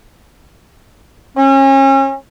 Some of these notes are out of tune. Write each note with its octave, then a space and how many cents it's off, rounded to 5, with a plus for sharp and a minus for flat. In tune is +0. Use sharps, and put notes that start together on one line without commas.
C#4 -35